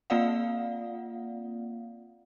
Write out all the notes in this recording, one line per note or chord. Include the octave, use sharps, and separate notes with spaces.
A#3 C4 F4 D5 F5 F#5